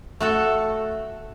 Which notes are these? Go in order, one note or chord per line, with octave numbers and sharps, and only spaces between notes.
A3 F#4 A4